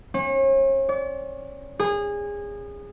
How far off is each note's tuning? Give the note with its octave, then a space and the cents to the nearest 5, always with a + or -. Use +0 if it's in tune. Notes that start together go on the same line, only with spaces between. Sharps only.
C#4 -40
D5 -45
G#4 -25